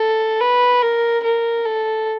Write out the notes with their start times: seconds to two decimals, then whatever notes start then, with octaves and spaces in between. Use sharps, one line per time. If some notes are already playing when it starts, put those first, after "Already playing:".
Already playing: A4
0.41 B4
0.82 A#4
1.23 A#4
1.64 A4